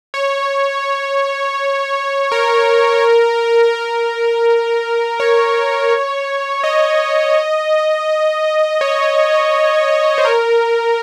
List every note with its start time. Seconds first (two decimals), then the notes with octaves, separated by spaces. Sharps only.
0.14 C#5
2.32 A#4
3.75 A#4
5.20 C#5
6.64 D#5
8.81 C#5
10.18 C5
10.25 A#4